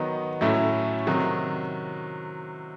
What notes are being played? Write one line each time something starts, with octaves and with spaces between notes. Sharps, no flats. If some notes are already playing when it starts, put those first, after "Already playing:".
Already playing: D#3 F#3 B3 D#4
A2 F#3 A3 C#4 E4
C3 D#3 F#3